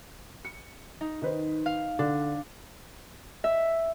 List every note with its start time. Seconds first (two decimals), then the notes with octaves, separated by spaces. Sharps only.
0.45 C#7
1.01 D#4
1.22 D#3 B4 C5
1.66 F5
1.99 D3 D4
3.44 E5